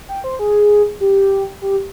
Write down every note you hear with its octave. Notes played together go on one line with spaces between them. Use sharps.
G5
C5
G#4
G4
G4